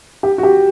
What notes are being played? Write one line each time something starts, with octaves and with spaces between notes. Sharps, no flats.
G4
F#4
G4